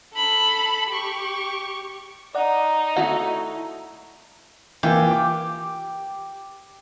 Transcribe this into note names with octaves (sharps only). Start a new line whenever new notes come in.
A4 B5
G4 C#6
D#4 D5 F#5
A3 E4 F#4 C#5
E3 A#3 F4 G4
D6